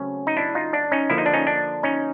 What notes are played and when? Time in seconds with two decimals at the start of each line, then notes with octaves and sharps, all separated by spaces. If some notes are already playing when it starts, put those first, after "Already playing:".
Already playing: C#3 F#3 A3 C4 C#4
0.27 D#4
0.37 D4 E4
0.55 D#4 F4
0.73 D4
0.92 C#4 D#4
1.10 D3 F3 A#3 E4
1.18 D#4
1.26 D4
1.33 C#4 D#4
1.47 D4
1.83 C#4 D#4